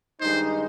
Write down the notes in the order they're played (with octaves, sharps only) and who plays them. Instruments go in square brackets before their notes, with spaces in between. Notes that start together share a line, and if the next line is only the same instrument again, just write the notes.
[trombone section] G2 D#3 G#3 D#4 [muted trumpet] C5